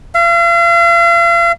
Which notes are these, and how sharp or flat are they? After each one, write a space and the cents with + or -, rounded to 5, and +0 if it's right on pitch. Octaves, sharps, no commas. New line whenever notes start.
F5 -40